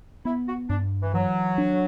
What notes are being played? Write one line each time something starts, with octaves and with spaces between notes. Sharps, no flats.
B3 E4
F#4
G2 D4
E3
E3 F#3
D4